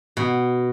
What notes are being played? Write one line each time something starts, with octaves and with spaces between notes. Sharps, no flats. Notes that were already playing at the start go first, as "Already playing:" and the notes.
B2